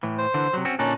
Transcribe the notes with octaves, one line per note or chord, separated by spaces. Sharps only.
A2 E3
C5
D3 E3
C3 F#3
C4 C#4 F#4
A#2 D3 C#4 D#4 A5 F#6